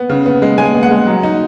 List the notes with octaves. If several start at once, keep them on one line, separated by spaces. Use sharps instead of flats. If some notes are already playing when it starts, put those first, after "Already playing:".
Already playing: B3
C#3
B3
G#3
G#3 G#5
B3
F#5
G#3
F#3
D#4